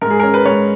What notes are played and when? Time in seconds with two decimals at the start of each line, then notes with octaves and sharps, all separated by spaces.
0.01 G#2 A#4
0.10 G#4
0.20 A#4
0.23 C#4
0.34 B4
0.45 G#2 C#5